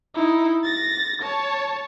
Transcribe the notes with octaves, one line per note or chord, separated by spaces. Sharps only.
D#4 E4
A6 A#6
C#5 A5